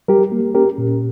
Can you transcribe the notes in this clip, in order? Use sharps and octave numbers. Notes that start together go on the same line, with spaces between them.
G3 G4 A#4
A#3
C#4 G4 A#4
A#2